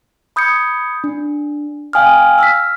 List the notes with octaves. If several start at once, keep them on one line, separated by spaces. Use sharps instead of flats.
B5 D#6 G6 G#6 C#7
D4
F5 G5 G#5 D#6 F6
E6 F6 B6